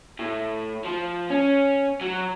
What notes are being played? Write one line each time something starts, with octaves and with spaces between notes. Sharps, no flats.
A2
F3
C#4
F#3